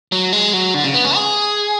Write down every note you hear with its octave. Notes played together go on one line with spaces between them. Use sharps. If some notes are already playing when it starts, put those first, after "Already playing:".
F#3
G#3
F#3
D3
C#3
B3
C#4
G#4